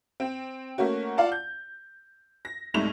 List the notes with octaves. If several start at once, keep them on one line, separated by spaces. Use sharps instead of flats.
C4
A3 A#3 C#4 F#4
F4 D5 F5 F#5 A5
G6
A#6
C2 G#2 A3 D#4 F7